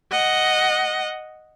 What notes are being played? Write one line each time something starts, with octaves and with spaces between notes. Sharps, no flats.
D#5 F#5